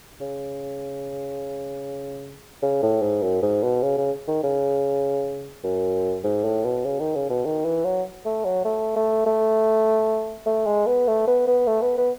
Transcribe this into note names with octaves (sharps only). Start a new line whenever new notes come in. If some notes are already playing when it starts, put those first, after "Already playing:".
C#3
C#3
A2
G#2
F#2
G#2
B2
C#3
C#3
D#3
C#3
F#2
G#2
A2
B2
C#3
D#3
C#3
B2
D#3
E3
F#3
A3
F#3
A3
A3
A3
A3
G#3
B3
A3
B3
B3
A3
B3
B3